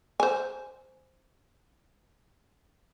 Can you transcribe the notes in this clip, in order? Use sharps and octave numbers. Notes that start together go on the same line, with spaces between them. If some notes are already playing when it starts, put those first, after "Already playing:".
C5 G#5